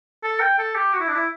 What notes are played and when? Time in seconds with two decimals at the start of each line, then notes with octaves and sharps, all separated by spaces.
0.23 A4
0.40 G5
0.58 A4
0.75 G4
0.93 F#4
1.00 E4
1.08 D4
1.15 E4